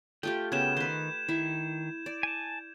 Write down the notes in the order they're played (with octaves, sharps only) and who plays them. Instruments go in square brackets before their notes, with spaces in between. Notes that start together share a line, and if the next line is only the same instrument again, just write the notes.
[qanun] A3 F4 G4 [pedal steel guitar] G5
[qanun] C#3 B3 [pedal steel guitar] G5 [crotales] G#6 E7
[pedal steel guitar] D#3 [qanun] B4 C6 [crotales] G6
[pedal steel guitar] D#3 [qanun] E4
[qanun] D5
[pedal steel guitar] G#5 A5